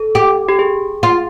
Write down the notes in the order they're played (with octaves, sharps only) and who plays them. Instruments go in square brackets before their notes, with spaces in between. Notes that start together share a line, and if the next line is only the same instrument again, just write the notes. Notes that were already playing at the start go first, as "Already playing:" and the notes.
Already playing: [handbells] A4
[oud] G4
[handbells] G4
G#4
[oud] F4